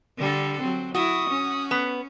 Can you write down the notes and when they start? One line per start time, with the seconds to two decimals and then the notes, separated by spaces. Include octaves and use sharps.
0.17 D3 G3 A4
0.60 F#3 C4
0.95 E4 F#4 D#6
1.30 C#4
1.71 B3